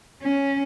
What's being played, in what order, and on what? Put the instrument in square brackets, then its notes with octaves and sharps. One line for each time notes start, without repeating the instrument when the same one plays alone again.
[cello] C#4